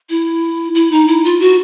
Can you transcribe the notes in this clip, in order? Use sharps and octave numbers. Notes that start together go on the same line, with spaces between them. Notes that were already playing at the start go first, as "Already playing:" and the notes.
E4
E4
D#4
E4
F4
F#4